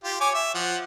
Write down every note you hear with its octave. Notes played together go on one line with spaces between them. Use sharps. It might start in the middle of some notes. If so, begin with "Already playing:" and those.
F4 G4
C#5 G#5 D6
E5
F3 F#5